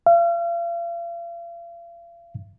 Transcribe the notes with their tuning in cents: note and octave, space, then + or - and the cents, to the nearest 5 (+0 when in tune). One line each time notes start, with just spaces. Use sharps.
F5 -40